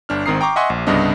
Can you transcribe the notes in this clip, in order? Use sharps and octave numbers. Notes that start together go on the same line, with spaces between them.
G1 D4 F6
G#1 D#3 C4 A#5 D#6 C7
G5 A#5 C#6 D6
D#5 E5 F#5 G#5 C6 C#6
A#1
C2 G2 C#3 B3 D4 D#5